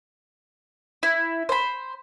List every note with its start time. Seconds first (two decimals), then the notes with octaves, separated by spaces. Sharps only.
1.03 E4
1.49 C5 B5